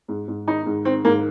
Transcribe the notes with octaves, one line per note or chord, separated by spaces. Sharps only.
G#2
G#2
D#3 D#4
G#2
D#3 C4
G#2 A#3